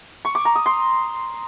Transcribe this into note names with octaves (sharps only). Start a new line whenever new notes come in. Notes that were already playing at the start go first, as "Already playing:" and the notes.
C#6
D6
A#5
D#6
C6